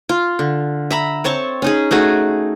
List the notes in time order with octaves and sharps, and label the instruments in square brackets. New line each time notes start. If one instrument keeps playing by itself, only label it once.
[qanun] F4
D3
E5 A#5 B5
C4 C#5 A5 C#6
C#4 D#4 G#4
A3 D#4 F#4 G#4